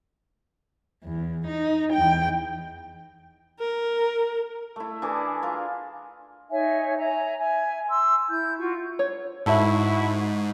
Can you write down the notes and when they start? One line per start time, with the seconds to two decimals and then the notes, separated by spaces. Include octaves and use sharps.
1.04 E2
1.47 D#4
1.94 E2 G5
3.59 A#4
4.76 A3 E4
5.02 E3 D4 G#4 A#4
5.43 F4 A#4
6.50 D#4 C#5 E5 G#5
6.97 E5 G#5 A#5
7.39 E5 G#5
7.89 C6 E6
8.30 E4 G6
8.58 F4 F#4 C#6
8.99 C#5
9.46 G#2 E4 F#4 A4 E5